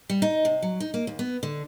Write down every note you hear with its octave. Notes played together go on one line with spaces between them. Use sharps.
G3
D#4
C3
F#3
D#4
A#3
D#2
B3
D3